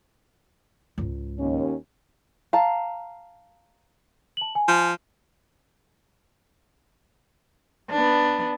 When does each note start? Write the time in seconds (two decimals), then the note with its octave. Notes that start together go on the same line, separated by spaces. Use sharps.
0.98 C#2 G#2
1.39 D#2 C#4
2.53 F5 A5 A#5
4.37 A5 F#7
4.55 G#5
4.68 F3
7.90 B3 D4